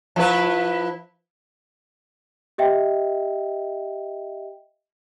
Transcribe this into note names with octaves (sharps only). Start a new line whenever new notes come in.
F3 E4 B4
G4 D#5 E5 G5